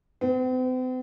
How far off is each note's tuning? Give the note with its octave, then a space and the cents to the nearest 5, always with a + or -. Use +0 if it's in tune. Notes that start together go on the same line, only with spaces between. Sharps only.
C4 -45